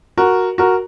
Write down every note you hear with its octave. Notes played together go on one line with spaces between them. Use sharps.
F#4 A#4
F#4 A#4